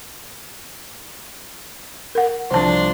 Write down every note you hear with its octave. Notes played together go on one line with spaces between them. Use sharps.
A#4 F#5
C2 F3 D4 C5 A5 C6